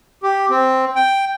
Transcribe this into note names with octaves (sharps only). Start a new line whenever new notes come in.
G4
C4
G5